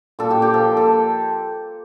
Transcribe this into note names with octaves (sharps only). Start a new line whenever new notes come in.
A#2 A4
G4
A#2
G4
F3 A4
A#2
A4